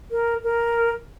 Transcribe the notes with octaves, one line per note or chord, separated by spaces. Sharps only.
A#4
A#4